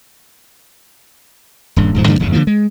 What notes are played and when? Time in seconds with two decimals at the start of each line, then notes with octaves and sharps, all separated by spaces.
1.76 D#1 G2
1.94 D#1 G#2 F3
2.07 G2 D3 F3 A#3
2.19 F#1 E2 C#3
2.32 D3 D#3 F3 A#3
2.47 G#3